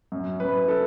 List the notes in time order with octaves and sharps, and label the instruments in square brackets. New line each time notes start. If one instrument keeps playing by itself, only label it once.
[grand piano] F#2
F#2 B4
A4